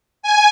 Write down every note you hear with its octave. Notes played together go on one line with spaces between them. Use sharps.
G#5